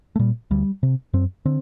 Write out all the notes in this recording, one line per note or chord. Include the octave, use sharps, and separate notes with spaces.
A3
A#2 G3
D2 G3
C3
F#2 C4
D3 C4